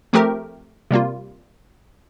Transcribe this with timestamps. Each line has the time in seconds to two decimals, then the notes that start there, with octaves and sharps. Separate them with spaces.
0.13 F3 A3 C4 G4 A#4
0.91 C3 G3 A#3 F4